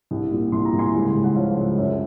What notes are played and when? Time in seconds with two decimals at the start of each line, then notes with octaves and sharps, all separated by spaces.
0.11 C2
0.31 A#2
0.52 C2 C6
0.65 A#5
0.73 C2
0.79 G#5 C6
0.94 C#2
1.15 C#2
1.24 F#5
1.36 F3 C#5 F5
1.57 C#2
1.78 F#2